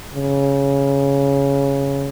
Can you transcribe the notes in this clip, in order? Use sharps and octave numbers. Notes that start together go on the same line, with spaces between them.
C#3